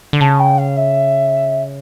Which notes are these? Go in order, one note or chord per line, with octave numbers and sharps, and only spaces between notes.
D3
C#3 A5
G5
F5
E5